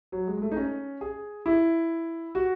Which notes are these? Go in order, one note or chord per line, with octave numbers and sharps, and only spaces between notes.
F#3
G#3
G#3
A3
D#4
C#4
G#4
E4
F#4